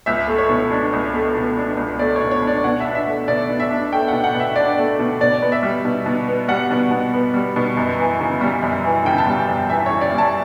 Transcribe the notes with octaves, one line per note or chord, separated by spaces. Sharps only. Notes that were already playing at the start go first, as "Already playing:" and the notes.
C#2 E5
A3
C#5
B2
D4
C#2
A3
B2
D4
C#2
A3 D5
B2 C#5
C#5
D4
D5
B2 F#5
D4 E5
E5
A3
B2 D5
B2
E5
D4
A3 G5
B2 F#5
F#5
B2
E5
D4 D5
A3
B2
B2 D5
B3
E5
G3
B2
B2
B3
G3 F#5
B2
B2
B3
G3
B2
F#2
E3
C#3
G3
F#2
E3
C#3 G5
A5
G3 G5
F#2
E3 E5
C#3 C#5
D5
G3
A5